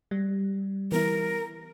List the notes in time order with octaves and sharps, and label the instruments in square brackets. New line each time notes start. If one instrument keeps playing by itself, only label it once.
[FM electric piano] G3
[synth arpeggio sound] E3 B3 E4 [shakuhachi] A#4